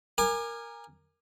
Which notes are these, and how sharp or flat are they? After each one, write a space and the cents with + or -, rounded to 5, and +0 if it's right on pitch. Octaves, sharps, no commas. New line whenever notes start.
A#4 +0 G#5 -15 D6 +35